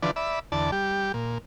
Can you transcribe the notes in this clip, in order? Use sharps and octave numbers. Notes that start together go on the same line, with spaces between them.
D3 E3 F3 D4 B4 D5
D5 E5 B5
E2 D3 D5 A5
G3 G4
A#2